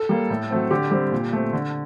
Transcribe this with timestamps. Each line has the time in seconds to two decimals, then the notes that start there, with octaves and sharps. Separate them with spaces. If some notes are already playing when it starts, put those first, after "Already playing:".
Already playing: A4
0.09 G3 A#3
0.30 A2
0.51 F#3 A3 C4
0.71 D3 G4
0.91 G3 C4
1.12 A#2
1.33 A3 C4
1.53 D3